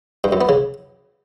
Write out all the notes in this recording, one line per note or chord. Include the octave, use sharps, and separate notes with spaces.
G2
F#2
B3
C#3